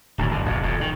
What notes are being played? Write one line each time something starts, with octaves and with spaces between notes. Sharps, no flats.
D1 D2 G#2 D#3
F#1 D3
F1 F2 B2
D#1 F2 B2
D#3